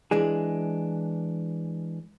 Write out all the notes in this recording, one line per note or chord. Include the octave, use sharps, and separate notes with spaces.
E3 G#3 D4 G#4